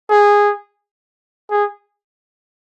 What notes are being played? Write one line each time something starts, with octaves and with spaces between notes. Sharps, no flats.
G#4
G#4